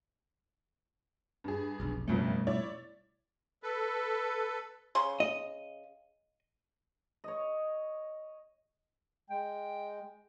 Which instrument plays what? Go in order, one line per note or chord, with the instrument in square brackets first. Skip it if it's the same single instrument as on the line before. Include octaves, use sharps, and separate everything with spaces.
[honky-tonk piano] G2 G#4
[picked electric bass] F1 B1
[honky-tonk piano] F#1 F2 C#4 [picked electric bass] B2 G3 A3
[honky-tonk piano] E4 C#5 D5
[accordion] A4 B4
[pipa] C#3 C6
[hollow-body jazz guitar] D#5
[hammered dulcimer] C#5 D#5
[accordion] G#3 [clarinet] G5